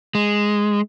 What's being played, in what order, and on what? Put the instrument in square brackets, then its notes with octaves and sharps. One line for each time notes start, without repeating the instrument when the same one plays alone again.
[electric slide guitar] G#3